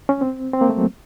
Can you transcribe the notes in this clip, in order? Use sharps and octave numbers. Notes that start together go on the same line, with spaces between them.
C#4
C4
C4
A#3
A3
F#3